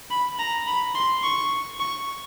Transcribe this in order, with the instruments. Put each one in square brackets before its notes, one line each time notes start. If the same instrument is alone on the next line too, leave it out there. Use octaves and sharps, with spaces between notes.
[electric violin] B5
A#5
B5
C6
C#6
C#6